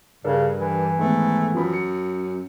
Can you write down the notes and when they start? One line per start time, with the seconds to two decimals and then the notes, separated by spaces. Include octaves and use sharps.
0.25 G2 C#3 D4 A4 A#4
0.60 E3
0.99 G#2 D#3 A3 B3
1.54 F#2 F3 B4 B5
1.73 C#7